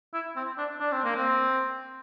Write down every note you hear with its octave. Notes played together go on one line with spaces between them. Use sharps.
E4
C4
D4
D4
C4
A#3
C4